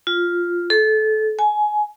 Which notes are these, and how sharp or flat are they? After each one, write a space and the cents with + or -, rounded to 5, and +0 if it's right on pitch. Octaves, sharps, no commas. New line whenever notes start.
F4 +0
A4 -25
G#5 +20